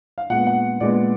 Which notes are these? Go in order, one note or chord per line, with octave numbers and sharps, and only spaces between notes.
F5
A#2 G#3 B3 F#5
F#5
A#2 G#3 B3 D5